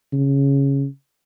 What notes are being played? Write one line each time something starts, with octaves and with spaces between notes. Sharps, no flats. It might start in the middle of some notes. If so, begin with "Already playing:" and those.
C#3